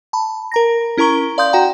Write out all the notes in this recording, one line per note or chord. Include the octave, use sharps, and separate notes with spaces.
A5 B5
A#4 A#5 A#6
C#4 E4 A#4 A#5 C#6 G7
D5 F5 C6 D#6 G6
F#4 F#5 G5 A#5